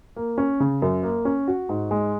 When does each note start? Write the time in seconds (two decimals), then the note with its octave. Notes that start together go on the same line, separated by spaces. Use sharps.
0.16 A#3
0.38 C#4
0.60 C#3
0.82 F#2
1.03 A#3
1.25 C#4
1.48 F#4
1.69 G#2
1.91 G#3